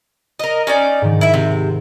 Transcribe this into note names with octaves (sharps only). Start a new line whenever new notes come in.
A#4 D#5
C#4 D#4 D5
G#2 D#3
E4 E5
C3